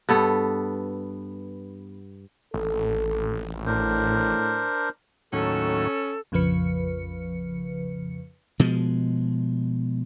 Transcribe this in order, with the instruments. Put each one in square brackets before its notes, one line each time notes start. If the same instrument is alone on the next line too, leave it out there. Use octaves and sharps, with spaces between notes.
[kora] G2 B3 A4
[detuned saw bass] A1 [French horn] A4
[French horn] A2 [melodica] D4 A#4 C5
[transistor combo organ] D#2 A2 F#3 [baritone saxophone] C#4 [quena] A4
[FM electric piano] A#1 F2 C#3 F3 B4 C#7
[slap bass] B2 F3 G#3